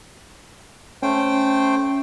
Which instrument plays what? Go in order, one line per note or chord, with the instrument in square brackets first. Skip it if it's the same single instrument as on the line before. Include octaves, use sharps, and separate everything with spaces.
[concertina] A3 C5 G5 [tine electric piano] C#4